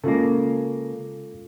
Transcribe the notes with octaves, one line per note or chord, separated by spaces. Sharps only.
C#3 G#3 A#3 F4 A4